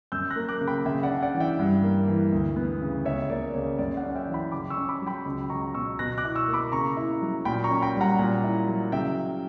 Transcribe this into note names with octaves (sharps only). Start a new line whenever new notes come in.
F#2 E6 G6
F#6 A#6
A#3
D6 F#6
C#3
G5 B5
C#3 E5 G5
D5 F#5
D4
D5 F#5
E3
E5 G5
G2
A#3
E3
D2
B3
C#3
C#2 C#5 E5
A#3 D5
C#3 C#5
F#2 D5
D5 F#5
C#4
E5 G5
E3
G5 B5
C#3 B5 D6
C#6 E6
C#4
B5 D6
F#3
G5 B5
C#2
C#2 A#5 C#6
B2 C#6 E6
B2 F#6 A#6
D6 F#6
E4
C#6 E6
A#3
B5 D6
C#3 A#5 C#6
E4
F#3
A#2 G5 B5
A#5 C#6
C#4
G5 B5
G3
F#5 A#5
A#2
E4
F#3
C#3 E5 G5